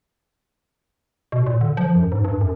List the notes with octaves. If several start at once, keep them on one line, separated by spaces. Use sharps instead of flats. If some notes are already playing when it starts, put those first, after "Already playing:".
B2
A#2
D3
F3
F#2
G#2
G2
F#2